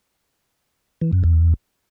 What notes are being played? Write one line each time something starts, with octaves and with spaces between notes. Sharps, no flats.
E3
F#2
E2